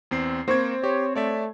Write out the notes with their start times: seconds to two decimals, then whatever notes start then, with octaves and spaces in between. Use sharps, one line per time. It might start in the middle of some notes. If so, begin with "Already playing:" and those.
0.11 E2 C4 C7
0.48 A#3 C4 C#6 G#6
0.84 G4 C#5
1.15 A3 C#5 D5 E5